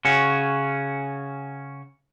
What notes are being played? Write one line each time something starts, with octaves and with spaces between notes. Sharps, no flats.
C#3 C#4 F#4